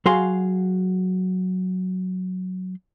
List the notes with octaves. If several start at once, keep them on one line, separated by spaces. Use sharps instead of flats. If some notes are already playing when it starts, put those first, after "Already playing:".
F#3 F#4 G#4 F5 C6